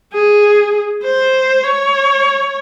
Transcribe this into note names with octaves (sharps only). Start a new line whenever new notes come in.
G#4
C5
C#5